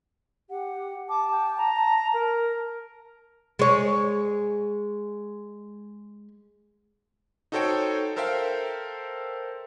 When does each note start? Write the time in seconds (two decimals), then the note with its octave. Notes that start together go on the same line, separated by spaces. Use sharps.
0.50 G4 F#5
1.09 A5 D6
1.31 G5
1.58 A#5
2.14 A#4
3.59 G#3 C#5
7.52 D#4 F#4 A4 C5 C#5 G5
8.16 A4 A#4 C5 E5 F5 G5